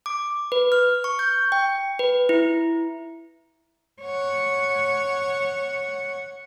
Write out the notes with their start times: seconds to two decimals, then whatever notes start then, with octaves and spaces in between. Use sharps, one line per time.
0.06 D6
0.52 B4
0.72 F6
1.04 C#6
1.19 G6
1.52 G5
1.99 B4
2.29 E4
4.02 C#5 F#5